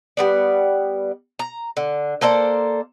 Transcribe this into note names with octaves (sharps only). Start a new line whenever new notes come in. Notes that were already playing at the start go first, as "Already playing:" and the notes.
G3 B3 D5
A#5
D3
A#3 A4 C5 D5